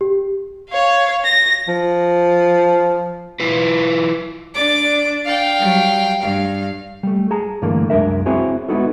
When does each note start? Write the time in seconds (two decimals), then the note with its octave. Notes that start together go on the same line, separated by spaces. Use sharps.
0.01 G4
0.70 C#5 F5
1.24 A#6
1.68 F3
3.40 E4 F4 B4
4.54 D4 D5 D6
5.25 F5 G5
5.59 F#3 G3
6.22 G2 F5
7.03 G3 A3
7.31 G#4 A5 A#5
7.62 G2 D3 E3 A3 A#3
7.90 C2 F#2 G#3 D4 A#4 E5
8.26 C4 E4 F#4 G#4 C5 C#5
8.68 G#3 B3 D#4 E4 F#4 A4